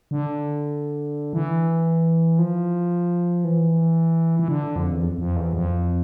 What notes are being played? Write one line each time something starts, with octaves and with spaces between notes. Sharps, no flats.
D3
E3
F3
E3
E3
D3
F2
E2
F2
F2
E2
F2